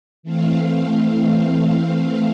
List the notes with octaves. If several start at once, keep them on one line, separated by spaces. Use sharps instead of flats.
E3 A3 C4 F5